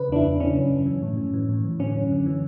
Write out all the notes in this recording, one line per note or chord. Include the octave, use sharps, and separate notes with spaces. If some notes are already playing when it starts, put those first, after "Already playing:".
Already playing: C#3 B4
E2 D4
E4
E2
C#3 C#4
F#2
F#2
E3
A2
E3
E3
A2
E3
D3 C#4
F#2
D3
E3